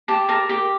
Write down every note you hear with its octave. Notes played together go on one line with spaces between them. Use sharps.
G4 A5
A#4 A5
G4 G5